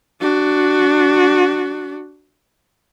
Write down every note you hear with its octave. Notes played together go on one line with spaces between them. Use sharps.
D4 F#4